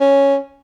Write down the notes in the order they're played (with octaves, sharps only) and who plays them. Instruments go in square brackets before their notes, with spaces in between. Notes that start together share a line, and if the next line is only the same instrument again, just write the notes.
[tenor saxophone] C#4